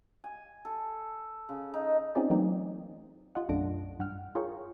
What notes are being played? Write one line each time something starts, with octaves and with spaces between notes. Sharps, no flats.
G#5
A4
C#3
D#4
C4 C#4 D#4 F4 G#4 D5
E3 F#3 A3 A#3 C4 D#4
F4 G4 D#5 F#5
B1 F#2 A3 D4 A#6 D7
G2 F#5 G5 F6
F4 G#4 A#4 C#5 G5 C#6